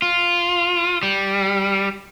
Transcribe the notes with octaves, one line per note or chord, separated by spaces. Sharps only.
F4
G3